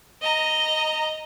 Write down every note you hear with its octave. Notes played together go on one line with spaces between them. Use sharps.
D#5 A#5